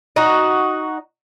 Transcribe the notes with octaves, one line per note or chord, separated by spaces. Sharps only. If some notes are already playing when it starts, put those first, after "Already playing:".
D#4 F#4